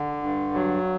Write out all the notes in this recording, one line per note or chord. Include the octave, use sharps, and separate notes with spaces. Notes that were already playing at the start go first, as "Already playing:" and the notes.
Already playing: D3
G2
F#3